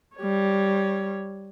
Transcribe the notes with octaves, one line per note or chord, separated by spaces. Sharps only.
G3 C#5